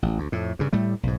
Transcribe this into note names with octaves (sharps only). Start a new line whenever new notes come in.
A1
D2
F2 A2
G2 C#3
A2 G3 A3
B1 G#2